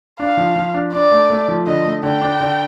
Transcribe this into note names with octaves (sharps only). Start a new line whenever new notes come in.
D4 F5
F3
F3
D4
D4 D5
A3
A3
F3
D3 D#5
A3
D3 G5
D4
D3